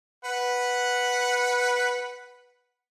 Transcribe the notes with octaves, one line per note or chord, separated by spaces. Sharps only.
B4 F#5